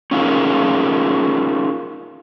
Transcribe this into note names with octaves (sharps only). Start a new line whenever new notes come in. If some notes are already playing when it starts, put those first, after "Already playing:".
C#4 D#4 F4 G4 G#4 A#4